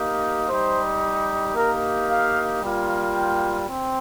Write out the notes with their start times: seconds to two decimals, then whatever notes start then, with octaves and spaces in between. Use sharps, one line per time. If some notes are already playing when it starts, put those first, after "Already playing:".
Already playing: A#3 D#4 G4
0.48 G3 D#4 G4 C5
1.55 A#3 D#4 G4 A#4
2.09 F5
2.62 G3 A#3 F4
3.16 G5
3.69 C4